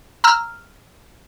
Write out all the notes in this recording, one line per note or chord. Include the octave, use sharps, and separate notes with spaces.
A#5 E6 F6